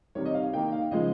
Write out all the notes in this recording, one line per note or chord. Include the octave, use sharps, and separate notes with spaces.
C3 D#3 G3 C#5
D#5
F5
D#3 A#3 D#4 G5
F5
C#3 F3 G#3 D#5